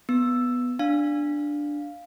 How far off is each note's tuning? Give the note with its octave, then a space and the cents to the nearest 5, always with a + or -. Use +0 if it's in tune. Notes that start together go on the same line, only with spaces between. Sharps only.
B3 +0 E6 +5
D4 +0 F5 +0